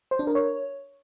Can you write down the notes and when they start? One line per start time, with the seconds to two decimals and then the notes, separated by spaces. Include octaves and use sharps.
0.11 C5
0.19 D4
0.27 A#4
0.35 C#5